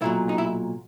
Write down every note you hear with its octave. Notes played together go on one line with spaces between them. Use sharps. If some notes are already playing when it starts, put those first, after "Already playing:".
B1 A#2 F#3 E4
D#4
E4